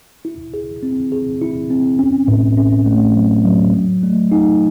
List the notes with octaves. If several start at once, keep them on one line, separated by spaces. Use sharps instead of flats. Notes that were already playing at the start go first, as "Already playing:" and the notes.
E4
G#4
C4
G#4
E4
C4
C#4
A2
C#4
A3
F#3
F#3
F#3
A3
D#4